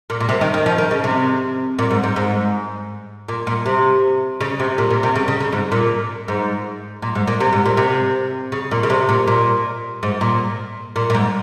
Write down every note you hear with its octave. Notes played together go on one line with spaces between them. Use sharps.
A#2
A#2
C3
D#3
D#3
F3
D#3
C#3
C3
A#2
G#2
G#2
G#2
A#2
A#2
C3
C#3
C3
A#2
A#2
C3
C#3
C#3
C#3
G#2
A#2
G#2
A#2
G#2
A#2
C3
G#2
A#2
C3
C#3
A#2
C#3
C3
A#2
A#2
G#2
A#2
A#2
A#2
G#2